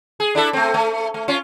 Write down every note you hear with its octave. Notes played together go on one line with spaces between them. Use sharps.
G#4
D4 E4 A4
A3 C4
A3
A3
C#4 F4